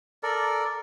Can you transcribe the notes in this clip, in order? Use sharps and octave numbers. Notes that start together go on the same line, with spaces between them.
A4 A#4 D5